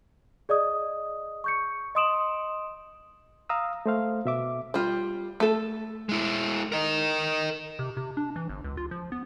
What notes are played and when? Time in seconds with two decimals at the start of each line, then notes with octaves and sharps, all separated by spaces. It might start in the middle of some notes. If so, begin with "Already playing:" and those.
0.49 G#4 D5 D#5 D#6
1.44 C#6 G6 C#7
1.95 D#5 C6 D#6 D7 E7 F#7
3.49 F5 A#5 D#6 E6
3.86 A3 C5 F5
4.25 B2 E5 D6
4.74 G3 F4
5.40 A3 A4
6.09 G#3 E4
6.72 A#4 D#5
7.79 C3
7.97 C3
8.17 D4
8.36 E3
8.49 G1
8.64 C#2
8.77 F4
8.91 F3
9.12 B3